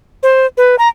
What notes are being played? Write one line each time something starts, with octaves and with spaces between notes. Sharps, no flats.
C5
B4
A#5